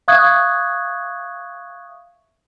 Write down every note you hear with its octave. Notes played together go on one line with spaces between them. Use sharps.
E5 F5 C#6 D#6 F#6 G#6